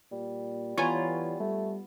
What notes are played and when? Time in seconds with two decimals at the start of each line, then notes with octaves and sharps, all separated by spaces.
0.12 A#2 G3
0.78 E3 B3 F4 C#5 G#5 A#5
1.40 G3 A3